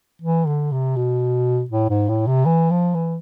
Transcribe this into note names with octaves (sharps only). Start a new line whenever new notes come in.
E3
D3
C3
B2
A2
G#2
A2
C3
E3
F3
E3